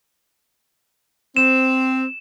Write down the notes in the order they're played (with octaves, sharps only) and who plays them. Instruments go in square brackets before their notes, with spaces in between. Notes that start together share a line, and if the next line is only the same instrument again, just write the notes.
[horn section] C4 [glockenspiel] E7